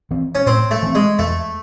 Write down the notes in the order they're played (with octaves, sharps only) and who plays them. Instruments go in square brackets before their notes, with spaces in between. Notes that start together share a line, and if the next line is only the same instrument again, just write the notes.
[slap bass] E3 C4
[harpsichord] C#4
[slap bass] A2 [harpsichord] C4
[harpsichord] A3
[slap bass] E3 C4
[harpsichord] G#3
[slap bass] E2 [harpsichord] A3